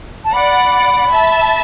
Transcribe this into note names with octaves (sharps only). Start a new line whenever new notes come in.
A5
D5 F#5 B5
E5 A5